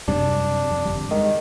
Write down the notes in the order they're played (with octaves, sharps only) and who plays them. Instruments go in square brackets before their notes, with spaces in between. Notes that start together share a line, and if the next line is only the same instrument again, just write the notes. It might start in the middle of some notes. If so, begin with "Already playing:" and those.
[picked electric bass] F#2 C3 G3 [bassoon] D4
[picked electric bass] F2
G1 G3
[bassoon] D#3 [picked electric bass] G#3